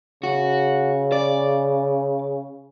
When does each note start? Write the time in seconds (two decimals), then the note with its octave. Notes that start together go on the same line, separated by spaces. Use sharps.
0.23 C#3 F#4
1.12 D5